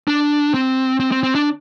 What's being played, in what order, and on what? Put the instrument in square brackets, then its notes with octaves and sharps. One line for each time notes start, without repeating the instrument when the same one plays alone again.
[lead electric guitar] D4
C4
C4
C4
C4
D4